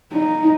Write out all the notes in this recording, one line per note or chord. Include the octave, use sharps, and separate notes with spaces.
D#4